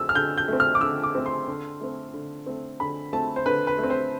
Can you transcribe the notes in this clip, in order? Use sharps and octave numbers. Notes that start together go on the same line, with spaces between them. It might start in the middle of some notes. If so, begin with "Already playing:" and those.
Already playing: D3 A3 C4 E6
F6
D3 G6
G6
A3 C4
F6
D6
D3 E6
D6
A3 C4
C6
D3
A3 C4
D3
A3 C4
D3 B5
A3 C4 A5
C5
D3 B4
B4
A3 C4
C5